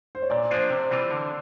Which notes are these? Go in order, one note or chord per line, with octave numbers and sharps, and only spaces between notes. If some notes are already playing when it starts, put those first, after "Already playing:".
C5
C#5
A#2 D5
F3 A#3 D4 F4 C5
C3
E3 G3 C4 F4
D3